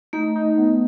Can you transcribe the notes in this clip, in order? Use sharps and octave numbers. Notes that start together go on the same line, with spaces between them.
A3 D#4
D#4
B3